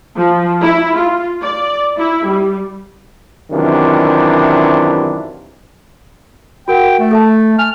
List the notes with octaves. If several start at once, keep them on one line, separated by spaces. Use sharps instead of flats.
F3
E4
F4
D5
E4
G3
F#2 C3 D#3 E3 D4 F4
F#4 A#4 F#5 G5
A3
A4 E5 A5
G#5 F6